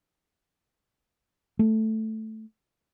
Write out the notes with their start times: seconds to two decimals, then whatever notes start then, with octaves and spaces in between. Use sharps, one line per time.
1.59 A3